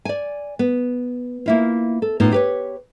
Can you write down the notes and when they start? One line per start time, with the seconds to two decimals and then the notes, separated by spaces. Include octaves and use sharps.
0.05 D5 G#5
0.59 B3
1.46 A#3 E4 F4
2.02 A4
2.20 A2 B3 D#4 F4
2.32 G4 B4 C#5